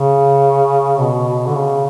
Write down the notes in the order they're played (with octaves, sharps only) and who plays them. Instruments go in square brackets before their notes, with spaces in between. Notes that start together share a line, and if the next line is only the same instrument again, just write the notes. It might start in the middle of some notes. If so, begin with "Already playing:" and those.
Already playing: [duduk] C#3
B2
D3
C#3